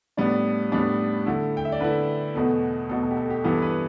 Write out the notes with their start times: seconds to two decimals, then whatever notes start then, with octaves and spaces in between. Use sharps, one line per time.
0.17 A2 G3 B3 D4 D5
0.72 A2 G3 B3 D4
1.26 D3 A3 E4
1.57 G5
1.65 E5
1.72 D5
1.80 D3 A3 E4 B4
2.35 E2 B2 A3
2.89 E2 B2 A3 A4
3.03 A4
3.11 G4
3.17 A4
3.30 G4
3.44 G2 E3 B3 E4 A4
3.62 B4